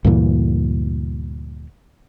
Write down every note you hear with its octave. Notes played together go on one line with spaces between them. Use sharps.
D2 G2 A#2 E3